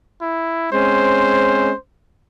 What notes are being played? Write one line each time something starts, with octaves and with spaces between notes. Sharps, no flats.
E4
G#3 C4 C#4 C5